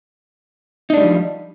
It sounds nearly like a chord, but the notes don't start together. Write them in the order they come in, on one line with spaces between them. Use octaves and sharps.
D#4 D4 G#3 G3 F3